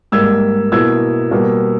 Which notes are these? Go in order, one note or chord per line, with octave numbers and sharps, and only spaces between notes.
G#2 G3 A#3 E6 G#6
B2 A#3 E4 E6 G#6
B2 G3 A#3